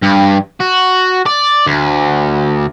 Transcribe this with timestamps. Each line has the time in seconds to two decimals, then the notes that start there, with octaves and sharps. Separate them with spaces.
0.03 G2
0.60 F#4
1.26 D5
1.66 D2